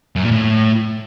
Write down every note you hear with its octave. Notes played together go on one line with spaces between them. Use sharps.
F#2
A#2
A2